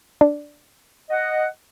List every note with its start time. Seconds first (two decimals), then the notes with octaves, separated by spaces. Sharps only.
0.21 D4
1.10 D#5 F#5